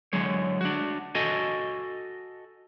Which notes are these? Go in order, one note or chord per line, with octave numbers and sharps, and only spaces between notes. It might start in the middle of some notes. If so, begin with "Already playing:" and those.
D3 F#3 G#3 C#5
D4 F#4
F#4 A4 D#5 G#5